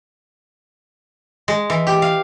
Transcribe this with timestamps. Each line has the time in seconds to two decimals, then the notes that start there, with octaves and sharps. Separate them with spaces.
1.48 G#3
1.70 E3
1.87 G4
2.02 F5